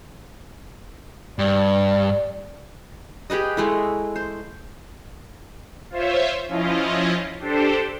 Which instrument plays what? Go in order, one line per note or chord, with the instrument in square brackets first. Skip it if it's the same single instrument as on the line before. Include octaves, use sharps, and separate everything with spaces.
[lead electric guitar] G2 [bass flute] D5
[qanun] G4 G#4 B4 D#5
G#3 A3 E4
C5
[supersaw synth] F4 C5 C#5 E5
F3 C#4 E4 F4 D#5
D4 G4 A4 C5